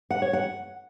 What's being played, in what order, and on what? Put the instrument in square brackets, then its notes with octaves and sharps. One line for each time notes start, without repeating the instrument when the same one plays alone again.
[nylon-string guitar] F#5
C#5
F#5